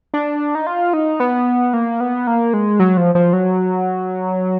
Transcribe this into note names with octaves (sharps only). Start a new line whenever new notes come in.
D4
D#4
F4
D#4
B3
A#3
B3
A#3
G#3
F#3
F3
F3
F#3